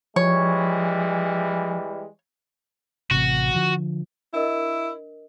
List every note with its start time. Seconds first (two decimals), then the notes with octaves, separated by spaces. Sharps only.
0.16 E3 F3 G3 G#3 C#5
3.11 A1 C3 F#4
3.54 D3 F3
4.33 D4 E4 A#4 D#5